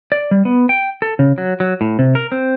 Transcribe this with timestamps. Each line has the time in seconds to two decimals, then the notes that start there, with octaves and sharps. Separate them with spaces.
0.12 D5
0.31 G3
0.45 B3
0.69 G5
1.02 A4
1.19 C#3
1.38 F#3
1.60 F#3
1.81 A2
1.99 C3
2.15 A#4
2.32 C4